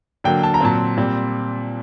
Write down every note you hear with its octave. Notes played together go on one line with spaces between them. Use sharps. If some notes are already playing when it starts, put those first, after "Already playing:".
D3 F#3 A#3 G5
A5
A#5
A#2 F#3 C4 A5
A#2 G3 C4